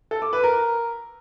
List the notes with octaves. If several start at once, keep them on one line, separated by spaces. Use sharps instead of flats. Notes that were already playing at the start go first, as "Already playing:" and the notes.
A4
D6
B4
A#4